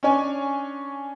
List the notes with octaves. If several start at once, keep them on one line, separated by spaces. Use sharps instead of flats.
C#4 D4 C#5 G#5